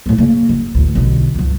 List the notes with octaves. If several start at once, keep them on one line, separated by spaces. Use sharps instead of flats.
A2 A3
C#3 A#3
F#1
A1 D2
B1 D3
C#2 G2